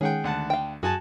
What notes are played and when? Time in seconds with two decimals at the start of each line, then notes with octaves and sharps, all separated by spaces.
0.01 D#3 G#3 C#4 G#4 F#5 G5
0.24 D2 F#5 A5
0.50 F5 G5
0.83 F#2 F#4 G#4 G#5 A5